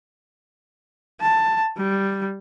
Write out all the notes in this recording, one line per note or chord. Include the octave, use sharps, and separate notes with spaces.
A5
G3